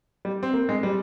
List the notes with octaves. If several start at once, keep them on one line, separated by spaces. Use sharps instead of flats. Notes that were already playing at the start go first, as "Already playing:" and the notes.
G3
C4
A#3
G#3
G3